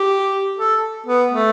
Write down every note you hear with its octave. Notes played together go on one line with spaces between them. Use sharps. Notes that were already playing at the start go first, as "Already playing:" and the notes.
Already playing: G4
A4
B3
A3